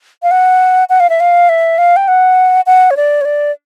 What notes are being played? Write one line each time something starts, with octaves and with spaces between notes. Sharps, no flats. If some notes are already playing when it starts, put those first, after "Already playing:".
F5
F#5
F#5
F5
E5
F5
E5
F5
G5
F#5
F#5
C#5
D5
C#5
D5